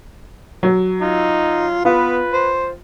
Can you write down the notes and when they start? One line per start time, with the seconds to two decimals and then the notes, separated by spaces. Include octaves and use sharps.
0.63 F#3
1.01 D#4 F4
1.85 B3 F4 B4
2.33 C5